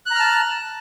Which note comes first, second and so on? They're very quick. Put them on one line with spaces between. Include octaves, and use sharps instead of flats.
F#6 A#5 F6 A5